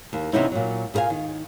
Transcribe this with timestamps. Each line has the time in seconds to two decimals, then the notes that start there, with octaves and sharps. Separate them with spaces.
0.13 D#2
0.33 C3 E3 B3 C#4 D#4 E4
0.52 A#2 F#3
0.94 A#2 G#4 A#4 F5 G#5
1.10 D#3